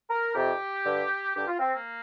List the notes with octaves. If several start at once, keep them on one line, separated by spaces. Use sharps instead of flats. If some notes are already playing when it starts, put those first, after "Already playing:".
A#4
F2 C3 G4
G2 D3
G2 D3 G4
F4
C4
A#3